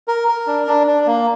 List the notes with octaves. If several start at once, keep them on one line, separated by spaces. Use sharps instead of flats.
A#4
A#4
D4
D4
D4
A#3